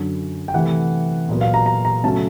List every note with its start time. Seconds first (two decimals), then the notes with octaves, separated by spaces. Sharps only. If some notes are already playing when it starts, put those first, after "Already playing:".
Already playing: F#2 D3 F#3
0.48 G5
0.54 C3 E3 A3 F#5
1.29 A#2 F#3 B3
1.41 F5
1.54 A#5
1.66 A#5
1.85 A#5
2.04 C#3 F#3 A3 C#4 A5